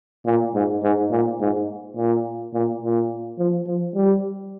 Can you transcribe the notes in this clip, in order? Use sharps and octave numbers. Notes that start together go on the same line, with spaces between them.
A#2
G#2
G#2
A#2
G#2
A#2
A#2
A#2
F3
F3
G3